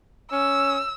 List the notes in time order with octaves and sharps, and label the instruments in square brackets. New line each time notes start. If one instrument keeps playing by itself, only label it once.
[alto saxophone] C#4 [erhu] E6